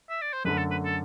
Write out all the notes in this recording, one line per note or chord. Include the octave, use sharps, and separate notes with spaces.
E5
D5
C5
F#2 D3 A3 B4
A4
B4
A4